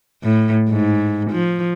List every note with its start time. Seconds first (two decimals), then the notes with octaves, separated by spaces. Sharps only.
0.23 A2
0.69 G#2
1.30 F3